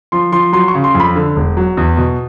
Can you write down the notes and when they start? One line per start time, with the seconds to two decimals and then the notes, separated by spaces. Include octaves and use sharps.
0.12 F3 C6
0.32 F3 C6
0.53 F#3 C6
0.68 C#6
0.74 C#3
0.84 C6
0.95 F2
1.00 B5
1.16 D3
1.36 E1
1.57 F#3
1.77 E2
1.97 B2